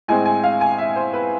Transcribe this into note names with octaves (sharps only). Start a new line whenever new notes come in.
A2 G#3 C4 G#5
G#5
F5
G#5
E5
C5
B4